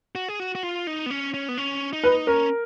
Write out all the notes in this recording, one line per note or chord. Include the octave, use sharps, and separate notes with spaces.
F#4
G#4
F#4
F#4
F4
D#4
B3
C#4
C#4
B3
C#4
D#4
B4
C#4 A#4